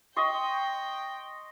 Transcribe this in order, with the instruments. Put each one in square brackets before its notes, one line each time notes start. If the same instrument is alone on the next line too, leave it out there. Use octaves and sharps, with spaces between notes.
[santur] D#5 C6 C#6 [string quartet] G5